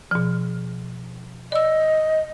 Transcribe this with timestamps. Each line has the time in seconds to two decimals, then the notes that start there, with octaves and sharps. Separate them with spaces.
0.11 B2 F3
1.52 D5 D#5 E6